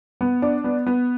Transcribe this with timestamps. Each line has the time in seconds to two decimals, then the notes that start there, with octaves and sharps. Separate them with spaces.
0.21 B3
0.42 D4
0.64 B3
0.86 B3